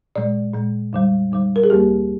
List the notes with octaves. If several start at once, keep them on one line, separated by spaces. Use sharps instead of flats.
A#2 G#3 D5
A#2 G#3
F2 D3 G3
F2 D3 G3
A#4
G#4
D2 D3 G3 A#3 G4